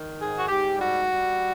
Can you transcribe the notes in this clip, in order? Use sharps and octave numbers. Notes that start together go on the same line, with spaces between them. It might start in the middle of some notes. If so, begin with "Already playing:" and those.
Already playing: D#3
G#2 G#4
F#4
G#2 G4
G3 F#4
G3